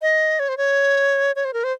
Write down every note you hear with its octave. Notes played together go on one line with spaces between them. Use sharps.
D#5
C#5
C5
C#5
C#5
C5
A#4
C5